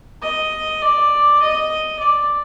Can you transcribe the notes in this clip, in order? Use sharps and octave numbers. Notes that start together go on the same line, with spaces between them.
D#5
D5
D#5
D5